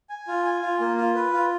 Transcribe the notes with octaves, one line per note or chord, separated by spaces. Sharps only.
G#5
F4
G#5
F4
A#3
F4
B4
F4